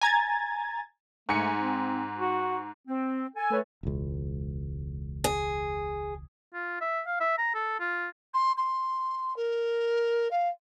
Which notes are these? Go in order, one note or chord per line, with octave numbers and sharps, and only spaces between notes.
G#5 A#5 G#6 A6
G#2 A3 G#5 C#7
C4
F#4
C4
A4 G#5
A3 B4 C#5
E1 C#2
G#4
F4
E5
F5
E5
A#5
A4
F4
C6
C6
A#4
F5